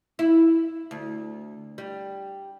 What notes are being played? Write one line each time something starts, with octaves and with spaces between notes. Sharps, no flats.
E4
D2
G3